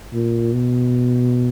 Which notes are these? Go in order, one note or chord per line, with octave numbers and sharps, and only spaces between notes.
A#2
B2